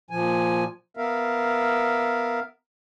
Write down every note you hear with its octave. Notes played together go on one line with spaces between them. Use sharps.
A#2 F3 G#5
B3 A#4 E5 F5